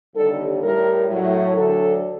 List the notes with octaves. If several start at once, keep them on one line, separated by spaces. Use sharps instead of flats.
D#2 D3 G3 A4
A2 G3 A#4
A2 F#3
D2 D3 F#3 A4